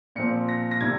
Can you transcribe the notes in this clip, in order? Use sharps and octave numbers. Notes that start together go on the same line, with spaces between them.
A#2 F3 C4 C#7
A#6
A#6
C3 D#3 G3 G#6